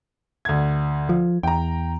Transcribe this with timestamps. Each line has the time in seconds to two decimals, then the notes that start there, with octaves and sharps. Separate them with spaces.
0.45 D2 G#6
1.09 F3
1.43 E2 G5 A#5